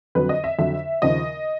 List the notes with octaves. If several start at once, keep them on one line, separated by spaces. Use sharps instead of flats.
F2 D3 F#3 B4
D#5
E5
F2 D3 F#3 E5
D#2 C#3 F3 D#5